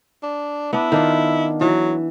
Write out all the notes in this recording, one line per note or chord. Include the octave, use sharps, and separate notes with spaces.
D4
B3 D4 E4
D#3 D4 F4
E3 F#3